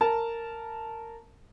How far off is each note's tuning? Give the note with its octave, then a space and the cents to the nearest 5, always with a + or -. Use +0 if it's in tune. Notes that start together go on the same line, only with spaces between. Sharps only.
A#4 -15 A5 -10